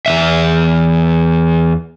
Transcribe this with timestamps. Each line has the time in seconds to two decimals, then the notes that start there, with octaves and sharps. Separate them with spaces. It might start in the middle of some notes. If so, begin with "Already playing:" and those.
0.06 E2 E3 E5